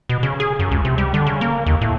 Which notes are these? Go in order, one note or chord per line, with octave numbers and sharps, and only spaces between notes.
B2
C#3
G#4
F#2
C#2
C3
G3
D3
C#3
A#3
D#2
A2